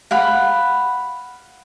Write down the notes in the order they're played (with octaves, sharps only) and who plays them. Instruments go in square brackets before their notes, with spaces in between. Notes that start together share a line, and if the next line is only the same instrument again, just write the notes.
[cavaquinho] F5 F#5 B5